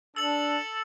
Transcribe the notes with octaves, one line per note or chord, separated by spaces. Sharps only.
D4 A4 E6 F#7